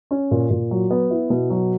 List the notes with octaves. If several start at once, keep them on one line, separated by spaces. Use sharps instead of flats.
C#4
A#2
A#2
F#3
B3
E4
B2
F#3